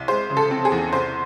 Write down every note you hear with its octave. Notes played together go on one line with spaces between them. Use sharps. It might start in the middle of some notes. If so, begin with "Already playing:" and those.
Already playing: C2
G#3 C5
C#3
A4
C4
G#4
E2
C2 C5